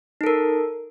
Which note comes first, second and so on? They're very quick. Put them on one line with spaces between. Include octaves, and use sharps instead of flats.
D#4 A4 A#4